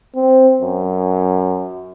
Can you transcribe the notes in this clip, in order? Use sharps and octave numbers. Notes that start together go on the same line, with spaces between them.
C4
F#2